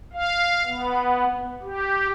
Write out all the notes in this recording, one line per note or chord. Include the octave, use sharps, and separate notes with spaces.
F5
B3
G4